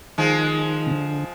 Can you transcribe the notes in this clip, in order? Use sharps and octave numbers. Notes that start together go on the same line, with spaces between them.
D#3 F3 G#3
C3
D3